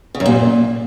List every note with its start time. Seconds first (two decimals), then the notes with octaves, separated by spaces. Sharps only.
0.15 C#3
0.20 F#2
0.26 A#2